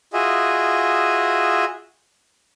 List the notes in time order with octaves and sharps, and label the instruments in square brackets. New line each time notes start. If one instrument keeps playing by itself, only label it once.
[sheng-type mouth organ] F4 F#4 G#4 D#5 E5